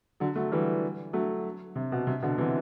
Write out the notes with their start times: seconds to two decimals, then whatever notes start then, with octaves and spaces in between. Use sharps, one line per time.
0.20 D3 F#3
0.36 F#3 A3
0.52 E3 G3
1.13 F#3 A3
1.76 C3
1.92 B2
2.07 C3
2.22 B2 D3
2.38 C3 E3